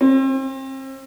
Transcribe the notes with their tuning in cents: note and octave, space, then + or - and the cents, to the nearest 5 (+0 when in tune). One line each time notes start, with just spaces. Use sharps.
C4 +35